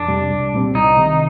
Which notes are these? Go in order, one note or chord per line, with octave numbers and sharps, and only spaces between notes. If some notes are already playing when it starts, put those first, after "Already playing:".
Already playing: F2 D4
C3 G3
C2
A#2 G3 C4
C2 D#4
C3 D#3